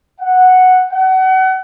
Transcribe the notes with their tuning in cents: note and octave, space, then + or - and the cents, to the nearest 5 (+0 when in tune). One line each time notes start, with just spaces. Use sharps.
F#5 -5
F#5 +30